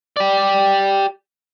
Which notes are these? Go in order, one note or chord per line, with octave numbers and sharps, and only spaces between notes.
G4 D5